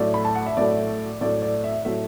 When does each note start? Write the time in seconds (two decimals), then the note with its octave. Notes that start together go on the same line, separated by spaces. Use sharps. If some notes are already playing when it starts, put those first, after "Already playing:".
Already playing: A2 F#3 A3 D5
0.14 B5
0.25 A5
0.35 F#5
0.46 E5
0.57 A2 F#3 A3 D5
1.21 A2 F#3 A3 D5
1.42 D5
1.64 E5
1.85 A2 F#3 A3 E5